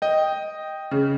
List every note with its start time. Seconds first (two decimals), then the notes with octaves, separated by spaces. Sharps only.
0.02 D#5 G5
0.91 C#3